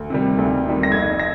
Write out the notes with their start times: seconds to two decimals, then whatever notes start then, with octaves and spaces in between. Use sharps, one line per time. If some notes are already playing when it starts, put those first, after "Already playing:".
Already playing: D2
0.10 C3 D#3 G3
0.38 D2
0.65 C3 D#3 G3
0.83 A#6
0.92 F2 G#6
1.19 A#6